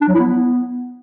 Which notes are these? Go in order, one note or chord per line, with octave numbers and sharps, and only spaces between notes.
D4
F#3
E4
B3